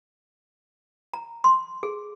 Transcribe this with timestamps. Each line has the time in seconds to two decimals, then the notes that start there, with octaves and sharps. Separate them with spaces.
1.14 A#5
1.44 C6
1.83 G#4